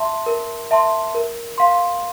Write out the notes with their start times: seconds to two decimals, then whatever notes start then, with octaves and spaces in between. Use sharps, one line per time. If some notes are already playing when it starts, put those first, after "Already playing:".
Already playing: E5 A5 C6
0.26 A#4
0.71 E5 A5 C6
1.15 A#4
1.58 F5 C6